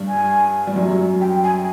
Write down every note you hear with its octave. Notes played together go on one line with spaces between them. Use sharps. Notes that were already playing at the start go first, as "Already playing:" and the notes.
Already playing: G2 G3
G#5
G3
F#2 F#3
G5
G#5